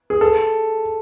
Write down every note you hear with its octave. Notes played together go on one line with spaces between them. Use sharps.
G#4
A4